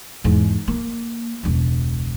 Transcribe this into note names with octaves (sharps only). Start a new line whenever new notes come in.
E2 G#2
A#3
E1 C#2